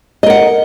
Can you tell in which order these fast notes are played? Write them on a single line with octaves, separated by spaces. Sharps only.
D#5 A#4 F#5